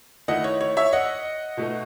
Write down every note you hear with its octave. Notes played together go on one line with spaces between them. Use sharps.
D#3 A3 E4 D#5 F#5
C#5
C#5
C#5 E5
D#5 F#5
B2 A3 D#4